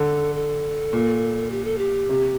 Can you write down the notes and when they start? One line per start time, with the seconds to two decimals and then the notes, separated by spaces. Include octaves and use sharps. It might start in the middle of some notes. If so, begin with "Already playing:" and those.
Already playing: D3 A4
0.35 A4
0.93 A#2
1.51 G4
1.65 A4
1.78 G4
2.09 C3